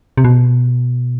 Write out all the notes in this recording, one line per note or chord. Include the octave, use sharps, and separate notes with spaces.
C3
B2